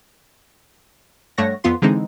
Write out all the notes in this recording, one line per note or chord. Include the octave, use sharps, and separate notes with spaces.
G2 A3 C#5 F#5 A#6
F2 B3 F4 C6
D3 E3 G#3 C4 D#4